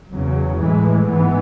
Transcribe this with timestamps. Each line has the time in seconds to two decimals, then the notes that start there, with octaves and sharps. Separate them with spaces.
0.11 E2 C#3 F#3
0.58 A2 E3 G#3
1.07 G#2 E3 B3